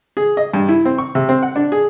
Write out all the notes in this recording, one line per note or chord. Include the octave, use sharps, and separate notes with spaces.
G#4
D#5
G2
E4
C4
C#6
C3
C4
F#5
D4
G#4